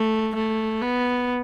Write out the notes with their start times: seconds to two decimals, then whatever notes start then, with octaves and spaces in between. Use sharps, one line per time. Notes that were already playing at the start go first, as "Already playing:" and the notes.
Already playing: A3
0.35 A3
0.81 B3